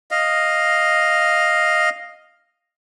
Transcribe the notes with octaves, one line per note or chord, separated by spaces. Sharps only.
D#5 F5